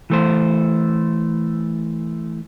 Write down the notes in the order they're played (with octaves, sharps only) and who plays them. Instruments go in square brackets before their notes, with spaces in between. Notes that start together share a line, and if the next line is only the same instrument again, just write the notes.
[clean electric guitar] E3 A3 C5